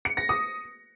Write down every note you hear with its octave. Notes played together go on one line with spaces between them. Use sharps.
C#7
A#6
D#6